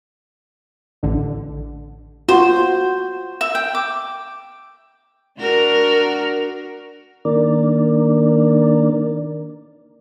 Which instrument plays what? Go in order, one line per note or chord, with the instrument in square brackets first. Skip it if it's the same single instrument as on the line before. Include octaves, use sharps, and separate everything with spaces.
[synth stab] A1 D3
[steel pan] F4 F#4 [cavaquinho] C5
[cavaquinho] E5
G5
D6
[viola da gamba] D4 F#4 A#4
[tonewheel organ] D#3 A#3 D4 A#4 D5